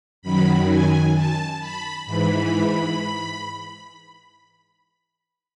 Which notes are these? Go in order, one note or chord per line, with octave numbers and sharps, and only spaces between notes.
F#2 D#3 F#3 B5
G#5
A5
B5
G#2 E3 B5